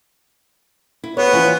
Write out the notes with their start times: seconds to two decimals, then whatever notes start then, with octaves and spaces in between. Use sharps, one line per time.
1.04 E4
1.17 B3 F#4 G#4 C#5
1.33 E3 F3 C#4